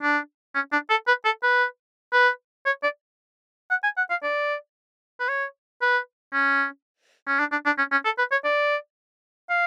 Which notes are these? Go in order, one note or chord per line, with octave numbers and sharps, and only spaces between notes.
D4
C#4
D4
A4
B4
A4
B4
B4
C#5
D5
F#5
G#5
F#5
F5
D5
B4
C#5
B4
C#4
C#4
D4
D4
D4
C#4
C#4
A4
B4
C#5
D5
F5